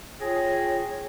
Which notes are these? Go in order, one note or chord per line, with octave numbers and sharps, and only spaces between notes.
F4 G#4 C#5 G5 A#6